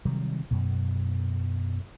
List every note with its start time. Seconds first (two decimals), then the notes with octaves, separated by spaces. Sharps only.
0.05 C3 D#3 F#3 G3
0.51 F#2 B2